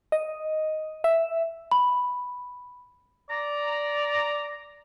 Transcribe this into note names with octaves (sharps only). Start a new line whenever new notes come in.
D#5
E5
B5
D5 A#5